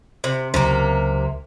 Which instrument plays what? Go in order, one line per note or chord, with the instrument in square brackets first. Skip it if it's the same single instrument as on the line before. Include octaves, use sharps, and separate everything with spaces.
[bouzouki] C3
[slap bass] C#2 F#3 C#4 [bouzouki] C3 A#3